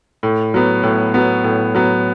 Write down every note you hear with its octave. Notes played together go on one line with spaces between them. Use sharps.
A2
F#3 B3
A2
F#3 B3
A2
F#3 B3